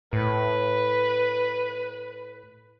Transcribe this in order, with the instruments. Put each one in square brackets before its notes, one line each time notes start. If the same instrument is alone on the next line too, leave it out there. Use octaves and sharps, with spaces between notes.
[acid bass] A2 [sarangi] B4